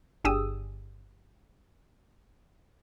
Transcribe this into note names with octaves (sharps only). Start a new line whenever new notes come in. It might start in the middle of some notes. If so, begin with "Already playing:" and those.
G1 D4 G4 G#4 D#6 E6